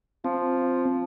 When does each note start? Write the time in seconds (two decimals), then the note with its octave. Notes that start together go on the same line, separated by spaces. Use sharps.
0.25 F3 C4